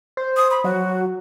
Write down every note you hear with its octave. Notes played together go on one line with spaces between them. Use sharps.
C5
D#6
B5
F#3 F#4